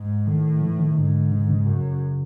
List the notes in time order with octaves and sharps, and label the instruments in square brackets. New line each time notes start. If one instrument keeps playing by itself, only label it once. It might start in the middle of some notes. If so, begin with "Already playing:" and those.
Already playing: [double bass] G#2
[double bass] A2 [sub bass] D#3
[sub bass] E3
D#3
[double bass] G#2 [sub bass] D3
[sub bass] C#3
D3
C#3
[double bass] F#2